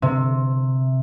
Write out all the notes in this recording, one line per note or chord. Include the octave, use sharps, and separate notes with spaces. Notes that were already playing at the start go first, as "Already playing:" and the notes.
C3